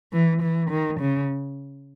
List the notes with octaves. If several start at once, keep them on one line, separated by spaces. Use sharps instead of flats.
E3
E3
D#3
C#3